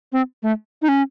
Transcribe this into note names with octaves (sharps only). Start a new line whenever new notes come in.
C4
A3
D#4
C#4